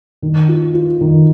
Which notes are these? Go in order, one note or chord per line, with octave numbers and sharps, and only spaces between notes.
D#3
F4
F4
D#3